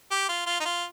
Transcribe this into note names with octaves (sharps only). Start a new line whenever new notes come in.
G4
F4
F4
D#4
F4